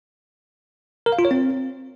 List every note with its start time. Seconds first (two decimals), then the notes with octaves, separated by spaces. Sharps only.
1.06 A#4
1.12 F5
1.19 F4
1.25 C#5
1.31 C4